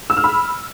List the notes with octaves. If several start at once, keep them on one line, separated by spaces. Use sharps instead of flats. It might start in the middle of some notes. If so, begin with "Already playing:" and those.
E6
F6
B5